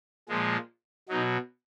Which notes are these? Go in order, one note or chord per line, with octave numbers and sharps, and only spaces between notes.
A#2 F3 G#3
B2 F#3 D#4